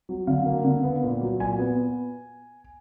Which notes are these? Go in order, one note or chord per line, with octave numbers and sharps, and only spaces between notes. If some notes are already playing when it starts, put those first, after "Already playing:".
F#3
D3 F5
A#3
D3
B3
A#2
F#3
A#2 G#5
B3